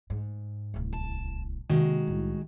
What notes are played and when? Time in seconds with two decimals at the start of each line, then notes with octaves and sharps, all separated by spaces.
0.10 G#2
0.74 D1 C2
0.93 A5
1.69 C3 D#3 G#3 A#3 F#4
2.07 C2 A2